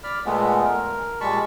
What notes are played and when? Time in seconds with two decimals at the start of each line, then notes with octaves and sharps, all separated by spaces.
0.04 D5 B5 F6
0.26 A#2 G#3 A3 B3
0.65 A#4
1.21 A#2 G3 G#3 A5 B5 C#6